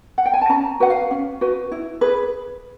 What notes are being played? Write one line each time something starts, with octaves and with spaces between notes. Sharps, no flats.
F#5
G5
G#5
A5
C#4 A#5
F#4 B4 F#5
F5
C#4
F#4 B4
E4
G#4 B4